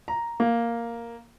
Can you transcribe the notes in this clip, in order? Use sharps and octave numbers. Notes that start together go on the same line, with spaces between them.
A#5
A#3